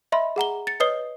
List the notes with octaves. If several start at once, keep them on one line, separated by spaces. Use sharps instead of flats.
D#5 E5 B5 C6
G#4 F#5 A#5 G7
A6 C#7
B4 C#5 D#5 D#6 C7 G7